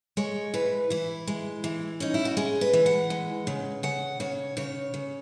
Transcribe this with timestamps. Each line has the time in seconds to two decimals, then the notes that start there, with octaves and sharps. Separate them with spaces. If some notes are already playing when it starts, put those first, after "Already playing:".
0.17 G#3 C#5
0.54 E3 B4
0.90 E3 E4
1.27 G#3
1.64 E3
2.00 C#4 D#4
2.14 E4
2.25 F#4
2.37 G#3 G#4
2.61 B4
2.73 E3
2.86 F#5
3.10 G#3
3.47 C#3
3.83 C#3 F#5
4.20 C#3 C#5
4.57 C#3 C#5
4.94 C#3